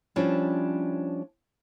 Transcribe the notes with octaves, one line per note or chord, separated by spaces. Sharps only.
F3 G3 C#4 D4 E4